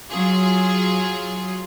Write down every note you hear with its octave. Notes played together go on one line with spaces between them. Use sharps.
F#3 F4 G#4